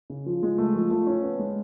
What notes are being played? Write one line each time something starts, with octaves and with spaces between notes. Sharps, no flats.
C#3
F3
G#3
A3
F3
A3
C#4
B3
G#3